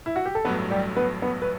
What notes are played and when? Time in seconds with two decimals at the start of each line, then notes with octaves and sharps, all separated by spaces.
0.06 E4
0.16 F#4
0.26 G4
0.35 A4
0.45 A1 G2 F#3 A3 B3 B4
0.70 G3 G4
0.96 B3 B4
1.22 B3 B4
1.42 B4